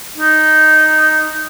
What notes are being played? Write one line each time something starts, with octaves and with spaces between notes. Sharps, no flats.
D#4